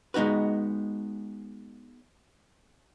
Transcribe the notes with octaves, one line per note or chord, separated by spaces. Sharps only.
G#3 B3 D#4 F#4 B4